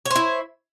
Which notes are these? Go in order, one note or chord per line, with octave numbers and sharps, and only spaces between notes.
E4 C5 C#5